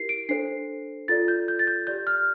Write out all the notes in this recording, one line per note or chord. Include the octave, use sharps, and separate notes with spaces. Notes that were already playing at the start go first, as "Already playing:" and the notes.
Already playing: E4 G4 A#4 C7
D7
D4 A4 C5 C7
F4 A4 D5 A6
G6
G6
A6
G6
G4 D5 G6
F6